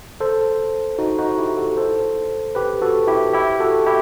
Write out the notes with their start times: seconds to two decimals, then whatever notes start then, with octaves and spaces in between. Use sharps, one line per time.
0.20 A4 C5
0.98 D#4 F#4
1.19 D#4 F#4
1.38 E4 G4
1.58 F#4 A4
1.77 A4 C5
2.55 G4 B4
2.82 F#4 A4
3.07 E4 G4
3.33 E4 G4
3.60 F#4 A4
3.86 E4 G4